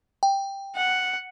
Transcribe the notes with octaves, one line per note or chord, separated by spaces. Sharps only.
G5
F#5